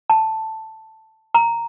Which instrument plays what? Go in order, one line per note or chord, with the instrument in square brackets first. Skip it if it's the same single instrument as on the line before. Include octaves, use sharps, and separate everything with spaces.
[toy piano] A5
A#5